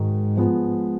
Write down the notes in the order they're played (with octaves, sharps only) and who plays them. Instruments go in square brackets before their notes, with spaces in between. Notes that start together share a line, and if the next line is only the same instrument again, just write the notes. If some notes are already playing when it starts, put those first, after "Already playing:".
Already playing: [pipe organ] G#2 [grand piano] D#3 G#3 D#4 F#4
[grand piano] F3 G#3 B3